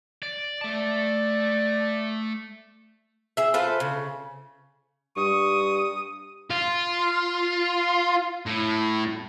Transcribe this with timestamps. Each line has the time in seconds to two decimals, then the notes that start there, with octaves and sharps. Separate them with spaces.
0.23 D5
0.61 A3 D5 A5
3.37 G#4 E5
3.54 F4 A4 B4 C5
3.80 C#3
5.17 G2 C#6 D#6
6.50 F4
8.46 A2